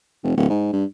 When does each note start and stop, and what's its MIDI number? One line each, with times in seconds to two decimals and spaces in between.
0.23 0.32 29
0.37 0.47 26
0.50 0.70 44
0.73 0.84 43